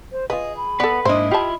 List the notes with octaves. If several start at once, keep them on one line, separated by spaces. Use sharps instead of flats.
C5
F4 G#4 B4 D#5
B5
B3 A4 B4 D5
G#2 A#3 D4 E4 C5 D#5
F4 G4 E5 A5 B5